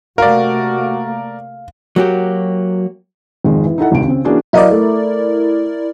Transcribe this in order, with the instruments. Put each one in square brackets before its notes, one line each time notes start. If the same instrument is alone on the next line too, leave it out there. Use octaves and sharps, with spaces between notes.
[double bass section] C3 A3 A#3 [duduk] F#4 [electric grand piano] A#4 D5 [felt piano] F5
[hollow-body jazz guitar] F#3 A#3 F#4 G4
[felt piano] G#1 F2 D#3 G#3
E3
D#4 E4 A4 F#5
D#1 G#1 C#2 D#3 D7
C#3 C4
E3 A#3 C#4 D4 F#4 G#4
[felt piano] F#3 D#5 F5 [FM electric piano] E4 A#4 D5
[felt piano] A3